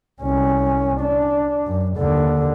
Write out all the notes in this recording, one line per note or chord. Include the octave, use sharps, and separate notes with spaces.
C2 C#4
D4
F#2
D#2 D3